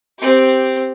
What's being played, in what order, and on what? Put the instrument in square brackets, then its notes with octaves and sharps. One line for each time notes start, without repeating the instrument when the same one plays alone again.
[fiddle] C4 G4